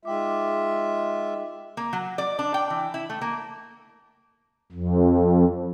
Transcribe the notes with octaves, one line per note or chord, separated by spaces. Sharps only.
G#3 D#4 F4 E5 G5 D6
A#3
F#3
D5
D4
G5
E3
E4
A3
A#3
F2